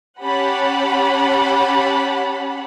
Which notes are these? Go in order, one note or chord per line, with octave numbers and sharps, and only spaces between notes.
C#4 G4 F#5 A5 B5